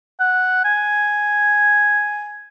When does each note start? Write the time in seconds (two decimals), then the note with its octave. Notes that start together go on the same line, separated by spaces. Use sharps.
0.20 F#5
0.64 G#5